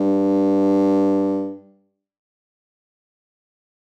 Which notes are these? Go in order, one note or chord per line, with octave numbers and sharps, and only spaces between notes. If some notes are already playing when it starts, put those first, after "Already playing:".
Already playing: G2